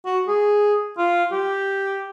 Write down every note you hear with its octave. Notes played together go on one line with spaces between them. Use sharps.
F#4
G#4
F4
G4